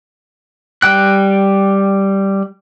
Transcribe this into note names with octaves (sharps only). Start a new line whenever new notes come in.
G3 G5 F#6